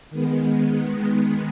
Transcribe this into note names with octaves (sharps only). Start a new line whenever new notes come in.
D#3 G#3 B3